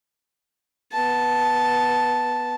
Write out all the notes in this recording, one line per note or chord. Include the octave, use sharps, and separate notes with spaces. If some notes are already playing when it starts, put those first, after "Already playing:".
B3 A5